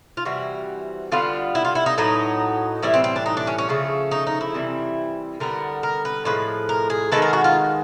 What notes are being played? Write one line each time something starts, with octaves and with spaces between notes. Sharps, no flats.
F4
C3 E3 G3 F#4
D3 G3 B3 F4
E4
F4
E4
D#4
A2 F#3 B3 D#4
A2 E3 G3 E4
C4
C4
D4
D#4
D4
C#4
C#4
C#3 F3 A3
D#4
D#4
E4
C3 E3 G3
D3 G3 B3 A#4
A#4
B4
A2 F3 G#3 B4
A#4
G#4
D#3 G#3 B3 A4
A#4
F#4
F4